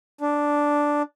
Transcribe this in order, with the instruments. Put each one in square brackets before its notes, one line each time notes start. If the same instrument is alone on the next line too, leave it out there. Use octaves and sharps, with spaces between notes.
[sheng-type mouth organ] D4